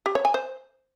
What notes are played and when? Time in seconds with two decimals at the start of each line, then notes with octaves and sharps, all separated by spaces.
0.06 G4
0.15 C#5
0.25 G#5
0.34 C5